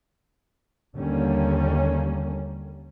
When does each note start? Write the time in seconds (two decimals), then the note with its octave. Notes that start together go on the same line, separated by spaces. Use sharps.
0.96 D#2 D3 G3 A#3 C#4